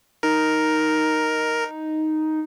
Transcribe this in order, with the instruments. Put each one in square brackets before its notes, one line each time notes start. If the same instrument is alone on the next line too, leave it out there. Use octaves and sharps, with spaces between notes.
[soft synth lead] D#4 [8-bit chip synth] A#4